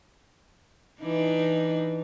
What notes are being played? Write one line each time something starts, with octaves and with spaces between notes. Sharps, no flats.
E3 D4 D#4